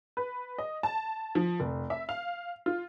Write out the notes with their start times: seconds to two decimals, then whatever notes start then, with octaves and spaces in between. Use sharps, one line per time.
0.17 B4
0.58 D#5
0.83 A5
1.35 F3
1.60 F1
1.90 E5
2.09 F5
2.66 F4